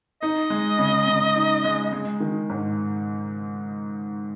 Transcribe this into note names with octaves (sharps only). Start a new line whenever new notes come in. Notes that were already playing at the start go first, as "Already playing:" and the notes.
D#4 D#5
G#3
C#3
C#3
D#4
G#3
G#3
D#3
G#2